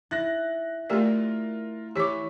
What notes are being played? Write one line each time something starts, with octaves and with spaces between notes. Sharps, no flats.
E4 F#6 A6 A#6
A3 F4 G4 A#4 D5
E3 G4 C#5 D6 B6